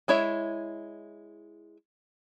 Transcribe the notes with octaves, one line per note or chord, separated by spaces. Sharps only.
G#3 E4 C#5 E5